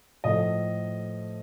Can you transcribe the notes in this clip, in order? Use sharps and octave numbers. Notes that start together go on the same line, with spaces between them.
A2 F3 A3 D#5